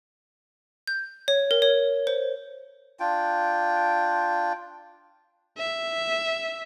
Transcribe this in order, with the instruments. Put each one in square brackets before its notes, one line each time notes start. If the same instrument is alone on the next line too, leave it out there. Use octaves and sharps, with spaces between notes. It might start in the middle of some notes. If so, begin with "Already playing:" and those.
[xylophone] G6
C#5
A#4
C#5
C5
[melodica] D4 F4 G5
[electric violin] E5